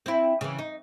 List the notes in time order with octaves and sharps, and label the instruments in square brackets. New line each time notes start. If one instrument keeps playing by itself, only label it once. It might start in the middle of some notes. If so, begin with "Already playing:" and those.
[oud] C4 E4
C#3 E3
D#4